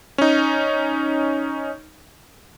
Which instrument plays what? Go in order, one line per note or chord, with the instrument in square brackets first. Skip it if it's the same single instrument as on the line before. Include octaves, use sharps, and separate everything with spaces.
[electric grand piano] C#4 D#4